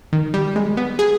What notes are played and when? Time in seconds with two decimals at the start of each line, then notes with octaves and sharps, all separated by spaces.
0.13 D#3
0.34 G3
0.56 G#3
0.77 B3
0.99 G#4